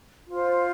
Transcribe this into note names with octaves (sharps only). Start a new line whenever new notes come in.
F4 C5